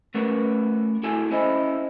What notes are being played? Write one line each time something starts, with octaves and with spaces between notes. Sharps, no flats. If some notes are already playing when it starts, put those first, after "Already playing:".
A3 B3 C#4 F#4 A#4 B4
E4 F#4 A4 G#5
C#4 E4 C5 D#5